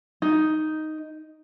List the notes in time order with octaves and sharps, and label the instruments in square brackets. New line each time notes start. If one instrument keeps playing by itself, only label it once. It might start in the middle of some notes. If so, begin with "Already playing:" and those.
[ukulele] D#4